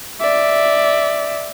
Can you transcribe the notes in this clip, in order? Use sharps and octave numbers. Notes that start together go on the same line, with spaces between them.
D5 E5